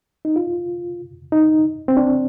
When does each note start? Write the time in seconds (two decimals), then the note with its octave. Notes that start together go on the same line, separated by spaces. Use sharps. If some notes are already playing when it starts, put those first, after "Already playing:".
0.25 D#4
0.36 F4
1.32 D#4
1.88 C4
1.97 D4